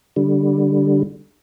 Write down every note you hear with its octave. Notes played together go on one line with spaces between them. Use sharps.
D3 G3